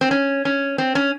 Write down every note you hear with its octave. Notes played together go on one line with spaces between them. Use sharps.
C4
C#4
C#4
C4
C#4